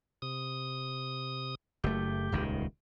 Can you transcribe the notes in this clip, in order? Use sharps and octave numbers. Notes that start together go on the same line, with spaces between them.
C3 D#6
F#1 A3 G4
D#1 C#2 D#3